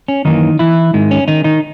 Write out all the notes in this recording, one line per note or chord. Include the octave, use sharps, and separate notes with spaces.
C#4
F#2 D#3 E3 A#3 D#4
E3 E4
G#2 D#3 G#3
C#4
D#3 D#4
D#3 D#4